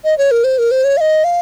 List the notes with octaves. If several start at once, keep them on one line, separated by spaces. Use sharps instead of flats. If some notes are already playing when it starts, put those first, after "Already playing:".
D#5
C#5
A#4
C5
A#4
C5
C#5
F5
D#5
F5